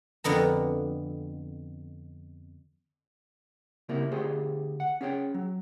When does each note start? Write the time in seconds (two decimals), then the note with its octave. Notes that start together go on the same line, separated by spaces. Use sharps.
0.24 F2 D3 B3 A#5
3.89 C#3 G3 A#3 C4 E4 A#4
4.11 D3 A3 G4 G#4 C5
4.80 F#5
5.01 C#4 G#4 C#5 G5
5.34 F#3